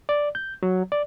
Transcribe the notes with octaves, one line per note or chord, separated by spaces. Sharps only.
D5
G6
F#3
D5